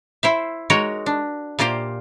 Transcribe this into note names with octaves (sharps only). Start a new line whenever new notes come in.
E4 C5 E5
G#3 D#4 F#4 A#4 C#5
D4
A#2 A#3 F4 G4 C5